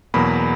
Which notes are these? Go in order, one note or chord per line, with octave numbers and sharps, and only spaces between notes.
E2 B2 F#3 A#3 B5